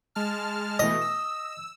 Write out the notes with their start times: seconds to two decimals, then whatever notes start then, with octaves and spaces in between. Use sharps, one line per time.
0.15 G#3 A5 F6
0.79 B2 E3 A3 D#5
1.01 E6